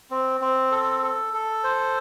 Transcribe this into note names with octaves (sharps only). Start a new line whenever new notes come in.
C4
C4
A4
A4
A4
C5